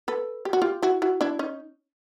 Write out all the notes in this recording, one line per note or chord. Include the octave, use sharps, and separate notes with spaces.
A4 B4
G4
F#4
F4 G4
E4 F#4
E4 F#4
D4 E4
C#4 D#4